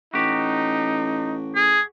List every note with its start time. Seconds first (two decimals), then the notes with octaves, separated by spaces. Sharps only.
0.14 A1 D#4 F#4 G4
1.55 G#4